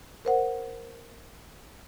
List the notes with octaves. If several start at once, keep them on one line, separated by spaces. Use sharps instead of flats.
A#4 C5 F#5